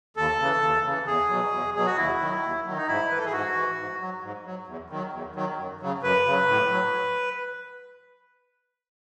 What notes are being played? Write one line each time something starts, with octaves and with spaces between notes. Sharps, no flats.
D#2 A4
C#3 E3
D#2
C#3 E3
E2 G#4
B2 F#3
E2
B2 F#3 G#4
F#4
D#2 E4
D#3 F#3
D#2
D#3 F#3
D#4
G#2 E4
E3 B4
A4
G#4
G#2 F#4
E3
G#2
F#3
G#2
F#3
E2
D#3 F#3
E2
D#3 F#3
F#2
C#3 F#3
F#2 B4
C#3 F#3
A2
F#3